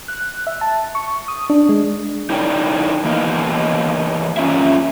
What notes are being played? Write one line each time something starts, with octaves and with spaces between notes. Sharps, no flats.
F#6
E5
A5
C#6
D#6
D4
G#3
D#4 E4 A#4 C#5 D5 G5
E3 A#3 B3 A#4 D#5
G2 C#4 F4 E5